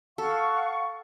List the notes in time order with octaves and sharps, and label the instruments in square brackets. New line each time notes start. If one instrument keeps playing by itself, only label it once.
[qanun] A4 [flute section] F5 F#5 C#6